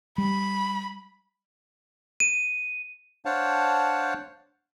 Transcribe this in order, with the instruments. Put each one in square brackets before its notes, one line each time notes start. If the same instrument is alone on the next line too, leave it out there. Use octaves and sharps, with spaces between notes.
[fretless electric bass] G3 [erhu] B5
[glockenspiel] D#7
[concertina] D4 C5 C#5 F5 F#5 A5